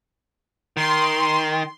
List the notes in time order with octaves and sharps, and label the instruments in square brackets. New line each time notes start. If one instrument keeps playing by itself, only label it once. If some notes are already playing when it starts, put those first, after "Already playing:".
[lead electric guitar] D#3 [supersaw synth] C6